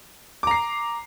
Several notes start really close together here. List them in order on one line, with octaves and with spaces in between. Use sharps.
D6 A#5 C7